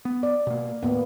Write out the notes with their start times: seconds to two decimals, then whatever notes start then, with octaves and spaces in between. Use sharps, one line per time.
0.05 B3
0.23 D5
0.47 B2 A#3
0.83 D#2 A2 A#3 B3